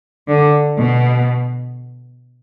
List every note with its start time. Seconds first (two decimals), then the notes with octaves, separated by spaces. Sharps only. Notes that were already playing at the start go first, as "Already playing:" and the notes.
0.28 D3
0.78 B2